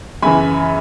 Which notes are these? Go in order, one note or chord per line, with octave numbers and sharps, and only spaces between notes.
F#2 C#3 E3 G#5 B5